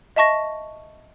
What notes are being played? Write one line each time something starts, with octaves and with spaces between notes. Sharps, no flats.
D#5 E5 A5 C#6 A#6